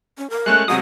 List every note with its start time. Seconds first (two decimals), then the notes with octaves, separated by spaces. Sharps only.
0.18 C#4
0.30 A#4
0.46 G#3 A3 C#4 F#6
0.68 C3 F#3 G#3 F#4 D#6